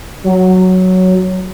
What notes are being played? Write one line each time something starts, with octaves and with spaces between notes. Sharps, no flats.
F#3